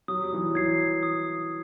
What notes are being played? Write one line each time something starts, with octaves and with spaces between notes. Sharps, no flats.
F#3 D#6
G3
E3 F#3
E3 F#3 G#6 C7
D#6